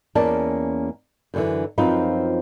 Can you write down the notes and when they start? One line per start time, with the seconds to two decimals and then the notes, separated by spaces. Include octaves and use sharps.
0.15 E2 A#3 C#4 D5 A5
1.34 F#2 D3 E3
1.78 F#2 F3 C4 D#4 F4 B4